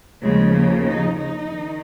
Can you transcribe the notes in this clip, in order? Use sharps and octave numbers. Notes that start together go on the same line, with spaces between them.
D#2 C#3 F3 G#3
A#3
D#4
D#4
D#3